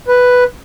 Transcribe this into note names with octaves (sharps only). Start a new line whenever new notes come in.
B4